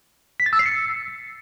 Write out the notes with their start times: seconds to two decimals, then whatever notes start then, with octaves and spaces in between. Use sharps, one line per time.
0.40 B6
0.46 A6
0.53 E6
0.59 C7
0.66 C#7